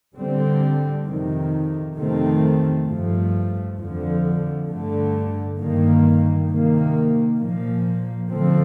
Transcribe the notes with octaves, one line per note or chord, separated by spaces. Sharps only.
D3 G3 C4
F2 C3 D#3
F2 C3 D#3 A3 C4
G2 F3 A3
F2 D3 F3
G2 D3 A3
G2 D#3 A#3
C3 D#3 A#3
A#2 F3 A#3
D3 F3 A3 C4